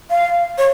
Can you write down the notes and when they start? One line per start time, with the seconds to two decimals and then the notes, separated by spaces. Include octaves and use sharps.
0.10 F5
0.58 C#5